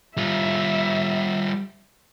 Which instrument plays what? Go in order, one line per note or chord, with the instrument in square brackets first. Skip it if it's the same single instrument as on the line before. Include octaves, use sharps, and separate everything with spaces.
[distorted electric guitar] G3 F4 [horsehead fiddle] E5